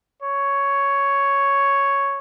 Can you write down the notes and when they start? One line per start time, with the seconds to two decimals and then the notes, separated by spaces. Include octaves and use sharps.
0.22 C#5